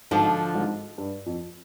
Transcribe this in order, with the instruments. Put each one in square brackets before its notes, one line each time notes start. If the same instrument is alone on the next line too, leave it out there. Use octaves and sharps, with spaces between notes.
[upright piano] G#1 G#2 [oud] D3 F3
[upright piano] G#1 G#2
G2
F2